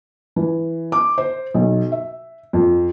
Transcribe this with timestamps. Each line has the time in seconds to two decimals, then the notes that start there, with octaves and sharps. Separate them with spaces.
0.36 E3
0.92 D6
1.18 C5
1.54 B1
1.92 E5
2.53 F2